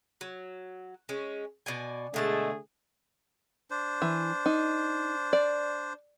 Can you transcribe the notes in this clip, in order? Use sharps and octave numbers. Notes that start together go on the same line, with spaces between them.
F#3
G#3 C#4
B2 D5 G#5
B2 D3 G#3 A3 G#4 A5
D4 C5
E3
D#4
D5